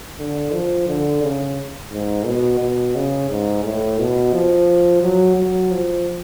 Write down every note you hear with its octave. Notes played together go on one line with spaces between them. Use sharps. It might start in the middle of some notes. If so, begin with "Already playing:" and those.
D3
F3
D3
C#3
G#2
B2
B2
C#3
G#2
A2
B2
F3
F#3
F#3
F3